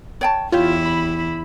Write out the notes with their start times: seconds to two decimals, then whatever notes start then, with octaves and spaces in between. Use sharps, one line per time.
0.21 C#5 G5 A5
0.52 E2 E4 F4 G4 C#5
0.86 B5